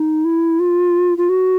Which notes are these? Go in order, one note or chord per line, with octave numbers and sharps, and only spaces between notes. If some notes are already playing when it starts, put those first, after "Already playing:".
Already playing: D#4
E4
F4
F4
F#4